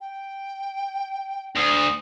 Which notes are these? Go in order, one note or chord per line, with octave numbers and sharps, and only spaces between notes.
G5
D2 D#6